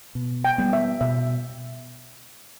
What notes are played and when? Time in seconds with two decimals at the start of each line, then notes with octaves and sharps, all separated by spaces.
0.15 B2
0.45 G5
0.58 G3 B3
0.73 E5
1.01 B2 E5